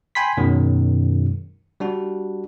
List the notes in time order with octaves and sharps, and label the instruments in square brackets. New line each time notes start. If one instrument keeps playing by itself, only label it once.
[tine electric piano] G5 G#5 B5 C6 B6
F#2 B2 D#3 F#3 G#3
G3 D4 F#4